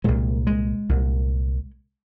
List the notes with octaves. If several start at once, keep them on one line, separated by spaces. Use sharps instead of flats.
C2 A#2 G#3
G#3
C2 A#2